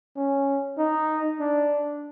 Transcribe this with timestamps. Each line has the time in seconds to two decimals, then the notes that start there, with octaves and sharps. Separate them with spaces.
0.16 C#4
0.78 D#4
1.40 D4